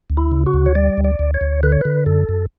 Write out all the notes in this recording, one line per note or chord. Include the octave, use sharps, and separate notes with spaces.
D2
E4
C#3
F#4
D2
C#5
G3 D5
D2
D5
D2
C#5
D2
D3 B4
C#5
D3 B4
F#2 A4
F#2